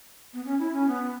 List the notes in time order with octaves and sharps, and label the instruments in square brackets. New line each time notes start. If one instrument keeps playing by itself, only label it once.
[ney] B3
C#4
E4
C#4
B3